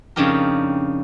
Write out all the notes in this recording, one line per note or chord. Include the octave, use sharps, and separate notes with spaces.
F2 C#3 D4 D#4 G4 A#4